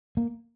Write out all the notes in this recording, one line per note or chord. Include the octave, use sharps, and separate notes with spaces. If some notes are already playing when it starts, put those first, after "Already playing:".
A#3